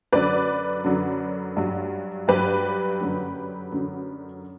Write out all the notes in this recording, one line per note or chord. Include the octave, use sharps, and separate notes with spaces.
F#2 D3 F#3 B4 D5
F#2 D3 F#3
G2 F#3
G2 F#3 G4 B4
F#2 D3 F#3
F#2 D3 F#3